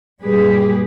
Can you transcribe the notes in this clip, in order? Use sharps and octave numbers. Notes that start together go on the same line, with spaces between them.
F#2 A#2 G3 G4 G#4 B4